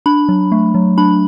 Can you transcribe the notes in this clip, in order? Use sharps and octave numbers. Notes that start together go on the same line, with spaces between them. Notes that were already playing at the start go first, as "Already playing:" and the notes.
D4 B5
F#3
A3
F#3
D4 B5